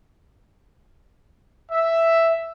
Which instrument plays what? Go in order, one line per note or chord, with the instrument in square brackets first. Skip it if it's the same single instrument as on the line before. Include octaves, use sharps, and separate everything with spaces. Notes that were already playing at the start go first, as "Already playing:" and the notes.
[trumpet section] E5